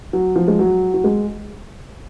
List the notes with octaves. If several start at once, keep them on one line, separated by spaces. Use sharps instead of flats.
F#3
F3
G#3
F#3
F#3
G#3